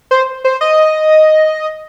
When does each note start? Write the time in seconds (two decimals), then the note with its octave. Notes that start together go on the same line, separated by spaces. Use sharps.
0.11 C5
0.44 C5
0.61 D#5